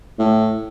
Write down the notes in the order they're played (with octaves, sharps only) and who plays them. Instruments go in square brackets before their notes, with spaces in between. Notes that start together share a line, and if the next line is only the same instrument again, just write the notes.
[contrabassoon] A2